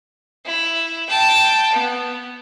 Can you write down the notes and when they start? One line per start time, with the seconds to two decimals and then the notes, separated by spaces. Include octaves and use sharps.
0.46 E4
1.09 G5 A5
1.73 B3